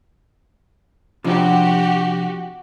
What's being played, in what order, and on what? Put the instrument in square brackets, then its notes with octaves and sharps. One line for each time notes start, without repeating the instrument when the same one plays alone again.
[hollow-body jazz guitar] C3 F3 D4 [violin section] F#4 G4